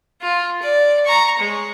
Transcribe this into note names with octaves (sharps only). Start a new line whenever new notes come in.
F4
D5
A#5 C#6
G#3 C#5